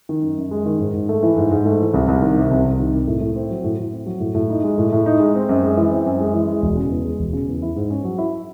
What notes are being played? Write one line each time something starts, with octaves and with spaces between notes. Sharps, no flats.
D#3
F#2
F#2
G#3
D#3
G#2
G#2
A3
E3
G#2
G#2
A3
E3
C2
C2
D#3
C3
C2
C2
D#3
C3
A2
A2
C4
F#3
A2
A2
C4
F#3
A2
A2
D#4
G#3
A2
A2
D#4
G#3
C4
F#2
G#3
E3
C4
F#2
G#3
E3
G#3
E1
C#3
E2
G#3
E1
C#3
E2
E4
G#2
C#4
F#3
E4